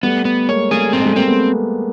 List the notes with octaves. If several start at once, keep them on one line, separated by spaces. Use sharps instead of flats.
G3 A3 B3
B3
G#3 A#3 C#5
G3 A3 G#4
C4
G#3
G3 A3
G#3 A#3 C4
A3 B3